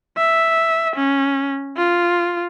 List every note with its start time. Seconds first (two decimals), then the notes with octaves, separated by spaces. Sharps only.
0.17 E5
0.96 C#4
1.77 F4